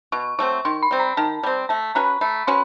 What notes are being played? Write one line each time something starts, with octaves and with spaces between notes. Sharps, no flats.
B2 C#6
F#3 A3 C4 C#6
D#3 C6
B5
G3 C4
A#5
D#3 A5
G3 C4
A3 A5
C#4 F#4 B4 A#5
A3 B5
C#4 F#4 B4 C6